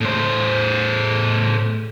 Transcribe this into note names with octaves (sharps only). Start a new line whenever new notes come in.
A2 C5